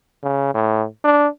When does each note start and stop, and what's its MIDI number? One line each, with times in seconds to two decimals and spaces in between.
0.23 0.54 49
0.55 0.86 45
1.04 1.28 62